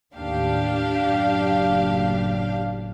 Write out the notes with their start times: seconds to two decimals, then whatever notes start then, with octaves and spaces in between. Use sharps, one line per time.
0.15 A1 D#2 D#3 D4 G4 F5
1.02 F#1 A2